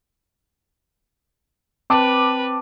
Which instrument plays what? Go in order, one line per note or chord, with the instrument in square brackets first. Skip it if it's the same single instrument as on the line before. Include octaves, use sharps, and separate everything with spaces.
[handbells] C4 [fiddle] B4 [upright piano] A5 D6